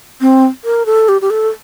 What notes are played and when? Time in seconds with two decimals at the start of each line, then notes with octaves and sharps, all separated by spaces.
0.21 C4
0.65 A#4
0.86 A4
1.09 G4
1.21 G4
1.30 A4